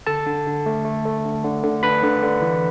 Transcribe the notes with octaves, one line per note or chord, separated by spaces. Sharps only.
D3 A4 A5
D3
D3
A3
A3
A3
D3
D3
D3
D4 B4 B5
D3
D3
E3